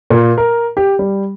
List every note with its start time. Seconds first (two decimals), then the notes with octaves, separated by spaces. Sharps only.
0.10 A#2
0.38 A#4
0.77 G4
0.99 G3